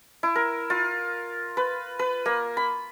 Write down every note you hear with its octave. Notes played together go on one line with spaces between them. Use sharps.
E4
A#4
F4
B4
B4
A#3
B5